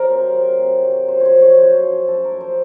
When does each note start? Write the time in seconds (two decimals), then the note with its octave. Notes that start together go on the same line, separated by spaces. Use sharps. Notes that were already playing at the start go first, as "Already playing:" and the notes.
Already playing: F#3 A#4 C5
0.10 C3
0.34 F#3
0.59 C3
0.83 F#3
1.08 F#2 C5
1.20 C#5
1.25 C5
1.33 F3
1.41 C#5
1.58 F#2 C5
1.83 F3
2.08 F#2 A4
2.24 A#4
2.32 F3
2.41 C5